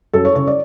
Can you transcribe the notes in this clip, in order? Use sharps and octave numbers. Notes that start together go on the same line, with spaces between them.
F#2 A4
C#5
C#3 C#5
D5